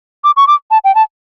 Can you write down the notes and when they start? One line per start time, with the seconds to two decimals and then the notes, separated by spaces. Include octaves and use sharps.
0.24 D6
0.37 C#6
0.47 D6
0.71 A5
0.84 G5
0.95 A5